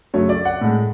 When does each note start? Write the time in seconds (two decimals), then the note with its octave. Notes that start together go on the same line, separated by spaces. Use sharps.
0.14 F#2 C#3 F#3 A3 C#5
0.29 D5
0.45 F#5
0.61 A2 G#3